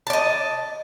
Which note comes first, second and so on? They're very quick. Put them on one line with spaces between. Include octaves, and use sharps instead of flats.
A5 D5 D#5